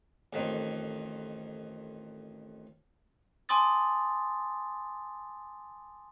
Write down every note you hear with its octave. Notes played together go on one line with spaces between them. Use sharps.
A1 F2 D#3
G#5 A5 C6 D6 D#6 A6